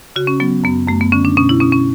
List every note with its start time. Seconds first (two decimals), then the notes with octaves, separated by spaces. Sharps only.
0.16 C#3 F#4
0.27 C#4
0.40 F#3 B3
0.64 F#2 B3
0.88 F#2 A3
1.01 B3
1.12 D3 C#4
1.25 D4
1.37 B2 C#4
1.49 E4
1.60 B2 C#4
1.72 C#4